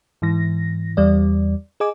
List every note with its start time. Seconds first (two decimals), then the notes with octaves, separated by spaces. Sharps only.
0.22 G#2 E3 A#6
0.97 E2 G3 D5
1.80 G#4 D#5 G#5 D6